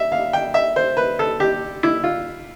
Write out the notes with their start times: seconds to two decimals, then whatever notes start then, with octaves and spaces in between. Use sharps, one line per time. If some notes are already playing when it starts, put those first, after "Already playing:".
Already playing: E5
0.12 F5
0.33 G5
0.54 E5
0.76 C5
0.97 B4
1.19 A4
1.40 G4
1.83 E4
2.04 F4